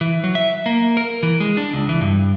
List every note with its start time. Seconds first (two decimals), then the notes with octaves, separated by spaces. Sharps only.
0.01 E3
0.24 F#3
0.35 E5
0.66 A#3
0.97 A#4
1.23 E3
1.40 G#3
1.57 D4
1.73 C#2
1.89 E3
2.01 G2